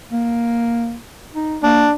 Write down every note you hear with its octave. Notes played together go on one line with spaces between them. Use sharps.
A#3
D#4
A#3 D4